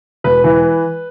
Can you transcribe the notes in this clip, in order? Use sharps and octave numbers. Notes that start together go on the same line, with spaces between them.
E1 B4
E3